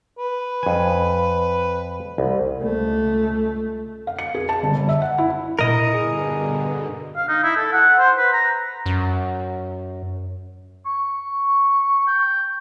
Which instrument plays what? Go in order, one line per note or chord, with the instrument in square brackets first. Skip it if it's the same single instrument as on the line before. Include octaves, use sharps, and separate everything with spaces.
[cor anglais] B4
[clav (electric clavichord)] F2 G#5
C2
[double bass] C#2 A3
[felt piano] F5
C#7
G#4
A5
G1
G1
E5
F#5
E4
[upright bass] A#2 D4 [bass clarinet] E4 [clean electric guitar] A#4 D#5 [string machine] D#6 C#7
[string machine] G2 B2 D3 [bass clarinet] G#4
[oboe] F5
D#4
E4
A4
F#5
C5
B4
A#5
[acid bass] F#2
[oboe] C#6
G5